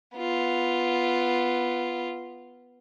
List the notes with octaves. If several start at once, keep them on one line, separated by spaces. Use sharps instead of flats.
B3 F4